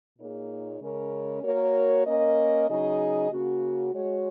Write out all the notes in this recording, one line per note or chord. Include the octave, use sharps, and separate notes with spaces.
A#2 A#3 D#4 G#4 C#5
C#3 G#3 C#4 A#4
A#3 F#4 A#4 C#5
A#3 C#4 A#4 D#5
C#3 F#3 D#4 G#4 D#5
C#3 A#3 C#4 F#4
G#3 F#4 C#5